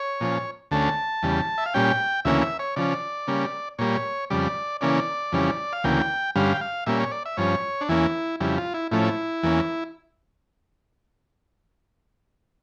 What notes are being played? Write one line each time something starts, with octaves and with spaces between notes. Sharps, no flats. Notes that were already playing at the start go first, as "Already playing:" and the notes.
Already playing: C#5
A#2 F3 C#4
D2 D3 A3 C#4 A5
E2 C#3 G3
E5
F5
A#2 G3 C#4 G5
D2 C#3 E3 A#3 C#4 E5
E5
C#5
C#3 F3 C#4 D5
C#3 G3 A#3 C#4
A#2 G3 A#3 C#5
F2 C#3 G3 D5
C#3 E3 A#3 C#4 D5
F2 C#3 E3 G3 C#4
F5
D2 C#3 E3 A#3 G5
G2 D3 G3 C#4 F5
G5
F5
A#2 G3 A#3 C#4 E5
C#5
D5
E5
G2 F3 C#4 C#5
D4
E2 E3 A#3 C#4 E4
F2 C#3 G3 E4
F4
E4
A2 F3 A3 C#4 E4
E2 E3 A#3 C#4